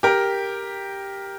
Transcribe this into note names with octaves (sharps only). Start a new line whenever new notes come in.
G4 A#4